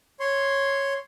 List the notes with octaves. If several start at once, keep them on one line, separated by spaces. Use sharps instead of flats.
C#5 C6